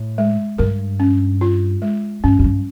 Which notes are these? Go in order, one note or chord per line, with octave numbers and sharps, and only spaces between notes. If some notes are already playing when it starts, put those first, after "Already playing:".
Already playing: A2
G#3
G2 A#4
C#4
F4
G#3
G2 C#4
F#2
G2